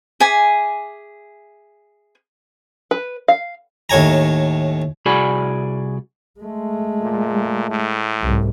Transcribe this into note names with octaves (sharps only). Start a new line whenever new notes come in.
G#4 E5 G#5 D6
B4
F5
D#2 A2 C#5 G#5 A#5
C2 F#4 G#4 D5 G#5 B5
G#3 A3
A#2
A2
C2 G#2